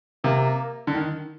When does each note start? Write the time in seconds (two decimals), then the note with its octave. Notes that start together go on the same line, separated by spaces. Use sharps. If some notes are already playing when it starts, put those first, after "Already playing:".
0.24 C3 A#3
0.87 D3
0.95 D#3